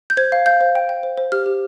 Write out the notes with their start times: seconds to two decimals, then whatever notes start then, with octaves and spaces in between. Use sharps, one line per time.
0.10 G6
0.17 C5 G#6
0.32 F5
0.46 F5 G6
0.61 C5
0.75 G5
0.89 G5
1.03 C5
1.17 C5
1.32 G4 F6
1.46 G4